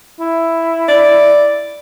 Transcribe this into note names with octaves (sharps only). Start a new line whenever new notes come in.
E4
D5